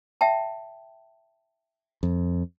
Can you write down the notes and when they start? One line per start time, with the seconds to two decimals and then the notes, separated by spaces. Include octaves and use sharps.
0.21 E5 G5 A5
2.03 F2